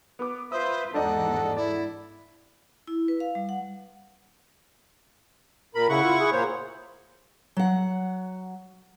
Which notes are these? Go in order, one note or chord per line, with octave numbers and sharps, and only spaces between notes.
B3 D6
F4 B4 C5 E5 D#6
E2 G#2 D4 A4 D#5 F#5 A#5
E4 D5
E4
B4
F5
G3
F#5
A#2 A#4 B5
C#3 E4 F#5 C#6
F4
G#4
A#2 A#3 C5 C#5
F#3 F#5